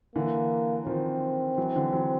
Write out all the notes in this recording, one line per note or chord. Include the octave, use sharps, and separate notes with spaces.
D3 E3 A#3
D#3 F3 C4
E3 F#3
D3 E3
E3 F#3